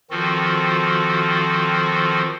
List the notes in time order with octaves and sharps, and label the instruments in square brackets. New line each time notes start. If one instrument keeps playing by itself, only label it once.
[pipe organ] D#3 F3 C4 F4 F#4 A4